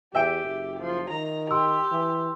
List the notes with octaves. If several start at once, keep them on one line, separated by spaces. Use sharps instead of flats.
E2 G4 E5 G5 D7
F#1
F3
D#3 A#5
G4 C6 E6
E3